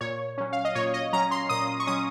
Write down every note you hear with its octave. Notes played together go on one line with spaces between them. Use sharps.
A#2 C#5
F#3 C#4
F5
D#5
A#2 C#5
D#5
F#3 C#4 A#5
C6
A#2 D#6
C#6
F#3 C#4 D#6